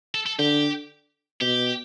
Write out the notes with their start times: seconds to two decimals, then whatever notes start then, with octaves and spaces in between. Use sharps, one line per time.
0.14 A4
0.26 A4
0.39 D3 G4
1.41 B2 G4